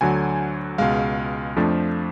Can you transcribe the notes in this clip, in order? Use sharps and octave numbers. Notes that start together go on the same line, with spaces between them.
D2 D3 F#3 G#5
C#2 B2 G#3 F5
F2 F3 A3 D4